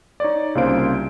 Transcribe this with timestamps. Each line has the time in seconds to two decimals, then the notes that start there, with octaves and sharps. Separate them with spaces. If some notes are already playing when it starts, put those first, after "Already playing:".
0.20 D#4 C#5 D5
0.55 C2 C#3 A#3 F4 C5 D7